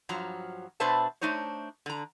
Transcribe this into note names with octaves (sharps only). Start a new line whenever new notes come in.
G2 F3 F#3 A#5
B2 D4 B4 C5 E5 A5
A3 D4 D#4 C5 C#5
D3 A#5